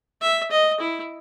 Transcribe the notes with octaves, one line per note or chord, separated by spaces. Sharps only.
E5
D#5
E4